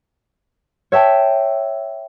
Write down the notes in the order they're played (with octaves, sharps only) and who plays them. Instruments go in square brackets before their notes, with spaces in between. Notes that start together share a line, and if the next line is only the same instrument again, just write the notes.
[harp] C#5 E5 G5 A5